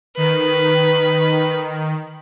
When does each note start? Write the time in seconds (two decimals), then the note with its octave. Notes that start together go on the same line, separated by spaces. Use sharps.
0.17 D#3 B4